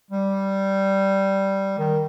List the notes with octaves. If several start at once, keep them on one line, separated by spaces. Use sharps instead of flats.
G3
D#3